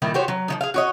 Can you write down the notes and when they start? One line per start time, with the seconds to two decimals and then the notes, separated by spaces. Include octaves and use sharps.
0.02 A#2 D#3 G3 E4
0.14 F#4 G4 C5 C#5
0.28 F#3
0.48 F3 F#3 D#4
0.61 G#4 F5
0.74 F#4 C#5 D#5